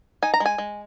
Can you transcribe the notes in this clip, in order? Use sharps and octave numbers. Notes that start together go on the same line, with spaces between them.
D#4 G#5
A#5
G#3
G#5
G#3